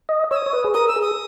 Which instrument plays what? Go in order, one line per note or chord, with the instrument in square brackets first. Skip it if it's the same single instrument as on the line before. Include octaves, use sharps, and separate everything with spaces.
[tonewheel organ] D#5
[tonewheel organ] C#5 [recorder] E6
[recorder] D#6
[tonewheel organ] C#5
B4
G#4
[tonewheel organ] A#4 [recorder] D#6
[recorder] E6
[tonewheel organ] G#4
[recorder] D#6